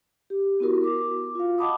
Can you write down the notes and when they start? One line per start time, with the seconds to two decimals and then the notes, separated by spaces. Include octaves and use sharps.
0.30 G4
0.60 B3 E4 F#4 A#4
0.84 D6
1.35 F4 F5
1.58 D#5 F#5 A5 B5 D6 D#6